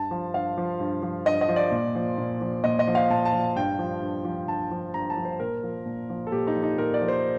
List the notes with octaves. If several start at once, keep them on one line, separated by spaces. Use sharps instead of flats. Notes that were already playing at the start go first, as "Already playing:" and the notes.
Already playing: G2 A5
F3
G2 F5
F3
G2
F3
G2 D#5
D#5
F3
D5
A#2
F3
A#2
F3
A#2 D#5
D#5
F3
F5
A#2 A5
A5
F3
G2 G5
F3
G2
F3
G2 A5
F3
G2 A#5
A5
F3
C5
A#2 A#4
F3
A#2
F3
A4
A#2 G4
D#4
F3
D#4
A#2 A#4
D5
F3
C5